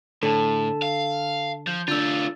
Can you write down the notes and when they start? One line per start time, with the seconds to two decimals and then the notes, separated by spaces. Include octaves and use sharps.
0.23 A2 D3 A4 A5
0.82 F5
1.67 F3 G6
1.88 D3 A3 D4 F4 E6 A6